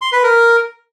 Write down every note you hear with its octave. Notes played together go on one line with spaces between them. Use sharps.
C6
B4
A#4